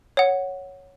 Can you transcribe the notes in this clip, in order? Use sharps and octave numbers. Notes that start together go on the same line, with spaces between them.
C#5 F#5